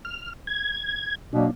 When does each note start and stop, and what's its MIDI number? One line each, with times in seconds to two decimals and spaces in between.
0.05 0.33 89
0.47 1.15 92
1.33 1.48 47
1.33 1.48 54
1.33 1.48 58
1.33 1.50 62